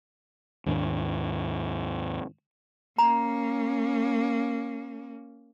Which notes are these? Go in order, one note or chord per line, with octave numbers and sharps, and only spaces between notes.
D#2 G#2 D#3 D4
A#3 C#4 A#5